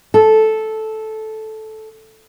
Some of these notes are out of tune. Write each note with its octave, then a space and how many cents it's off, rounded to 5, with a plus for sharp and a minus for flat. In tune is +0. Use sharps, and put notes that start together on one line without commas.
A4 -10